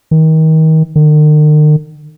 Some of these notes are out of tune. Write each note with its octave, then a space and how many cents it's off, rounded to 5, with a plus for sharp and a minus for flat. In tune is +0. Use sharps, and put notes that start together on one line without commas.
D#3 +30
D#3 -45